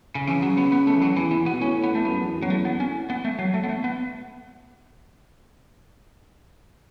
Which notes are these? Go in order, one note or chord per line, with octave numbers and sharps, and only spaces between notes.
C#3
C#3 E3
F#3
B3
B3
A3
E3
F#3
E2 E3
E3
B3
B2
A2 C#4
B3
A3
F#2 B3
E2
F#2
F#3
E2 A3
F#2 B3
A2 C#4
B3
A3
F#3
A3
B3
A3
B3